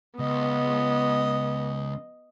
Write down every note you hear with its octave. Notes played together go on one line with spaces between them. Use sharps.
C#2 B3 D#5